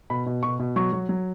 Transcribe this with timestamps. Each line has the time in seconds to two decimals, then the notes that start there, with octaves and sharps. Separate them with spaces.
0.10 B2 B5
0.26 B2
0.43 B2 C#6
0.59 B2
0.76 F#3 C#6
0.93 F#3
1.09 F#3